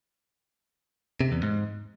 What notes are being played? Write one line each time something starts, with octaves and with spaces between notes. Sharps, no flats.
C3
E2
G#2